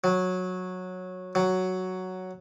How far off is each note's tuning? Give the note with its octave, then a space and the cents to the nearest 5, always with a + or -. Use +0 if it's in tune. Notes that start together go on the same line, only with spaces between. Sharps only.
F#3 -10
F#3 +5